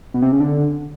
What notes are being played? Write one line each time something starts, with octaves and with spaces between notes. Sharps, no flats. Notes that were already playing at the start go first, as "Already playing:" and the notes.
B2
C3
C#3
D3